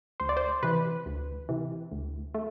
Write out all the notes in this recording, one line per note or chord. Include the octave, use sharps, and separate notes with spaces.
D2 C5
D5
C5
C3 E3 B4
D2
C3 E3
D2
A3